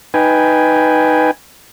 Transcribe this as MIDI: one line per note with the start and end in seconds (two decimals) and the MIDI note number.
0.14 1.31 63
0.14 1.31 71
0.14 1.31 79
0.14 1.31 80